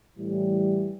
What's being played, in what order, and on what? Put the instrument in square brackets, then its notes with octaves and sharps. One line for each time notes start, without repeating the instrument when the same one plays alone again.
[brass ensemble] A2 E3 G3